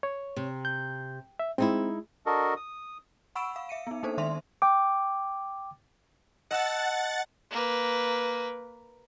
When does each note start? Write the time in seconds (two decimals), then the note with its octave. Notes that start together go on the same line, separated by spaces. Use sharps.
0.03 C#5
0.36 C3
0.65 G6
1.39 E5
1.58 G#3 C4 D#4 E4
2.26 D4 F#4 A4 A#4 D#5
2.56 D#6
3.35 F#5 B5 C#6 E6 D7 E7
3.56 F5
3.69 E5 C#7 D#7
3.87 B3 D#4
4.03 A#3 D4 D#4 A4 C5
4.17 D#3 G#3 C5 E5 C6 F7
4.62 G5 D6
6.51 D#5 F#5 A5 E6 A6
7.51 A#3 B4